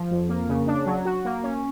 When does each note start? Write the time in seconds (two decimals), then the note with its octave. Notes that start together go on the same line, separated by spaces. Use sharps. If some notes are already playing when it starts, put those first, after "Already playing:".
Already playing: F3
0.11 F2
0.29 A#3
0.49 C#3
0.67 D4
0.86 F#3
1.05 F#4
1.25 A#3
1.43 C#4